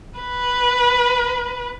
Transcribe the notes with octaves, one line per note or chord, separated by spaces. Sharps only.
B4